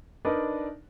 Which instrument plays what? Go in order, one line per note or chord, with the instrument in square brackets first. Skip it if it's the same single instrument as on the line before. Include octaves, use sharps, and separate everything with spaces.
[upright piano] D4 D#4 A#4 B4 D5